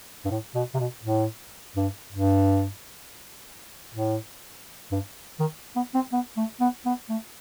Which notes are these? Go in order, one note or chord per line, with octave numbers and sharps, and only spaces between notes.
G2
A2
B2
C3
B2
A2
G2
G2
A2
G2
D#3
B3
C4
B3
A3
B3
B3
A3